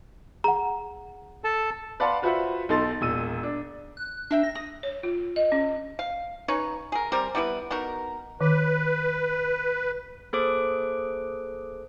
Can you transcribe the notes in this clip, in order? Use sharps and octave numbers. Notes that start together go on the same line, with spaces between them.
G#4 F#5 A#5
A4 A5
B4 D5 F5 F#5 A5 C6
F4 F#4 B4 C5 E5 F#5
B1 D#4 A4 C6 A6
E1 A#2 E6 D#7
D4
F#6
D4 A#4 E5 G5
A#6
D#6
C#5
F4
D#5
C#4
F5
C#4 D#4 B4 C#5
G#4 A#4
G3 C4 A#4
G3 B3 E4 B4
B3 D#4 F#4 A#4
D#3 B4
A#3 G#4 A4 C5 D6 D7